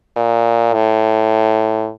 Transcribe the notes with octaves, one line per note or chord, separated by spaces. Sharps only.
A#2
A2